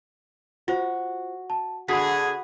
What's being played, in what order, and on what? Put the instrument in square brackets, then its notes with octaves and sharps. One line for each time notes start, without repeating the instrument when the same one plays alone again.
[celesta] F4 C5 [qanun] F#4
[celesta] A5
[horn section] D3 G#4 [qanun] F#4 B4 [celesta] B5 B6